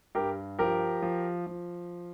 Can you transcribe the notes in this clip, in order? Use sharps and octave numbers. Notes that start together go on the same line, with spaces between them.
G2 G4 A#4
F3 G4 A#4
F3
F3